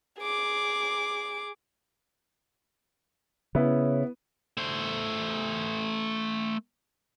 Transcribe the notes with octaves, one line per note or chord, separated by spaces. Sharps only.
G#4 D6
C#3 B3 E4
A3 C5